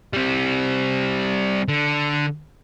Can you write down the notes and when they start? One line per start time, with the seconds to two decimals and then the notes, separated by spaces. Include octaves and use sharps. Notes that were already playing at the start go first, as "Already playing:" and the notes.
0.13 G3 C4
1.68 D3